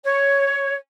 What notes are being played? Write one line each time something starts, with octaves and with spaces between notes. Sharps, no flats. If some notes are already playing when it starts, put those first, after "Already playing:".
C#5